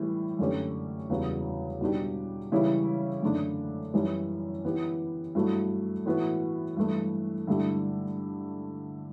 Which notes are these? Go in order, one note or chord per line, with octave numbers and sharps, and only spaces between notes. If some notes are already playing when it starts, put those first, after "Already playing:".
Already playing: A2 E3 G3
F#2 D3 A3 C#4 G4
E2 C#3 G3 B3 F#4
B2 G3 D4 G4
C#3 E3 G3 C#4 E4
F#2 D3 A3 D4
F#2 E3 G3 C#4
E3 B3 E4 G4
G2 F#3 A3 E4
A2 E3 B3 F#4
G2 E3 A3
G2 D3 A3 E4 G4